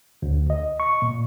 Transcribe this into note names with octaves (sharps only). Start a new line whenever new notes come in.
D2
D#5
C#6
A#2